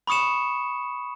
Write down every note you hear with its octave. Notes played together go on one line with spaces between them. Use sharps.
B5 C#6 D#6 C#7 E7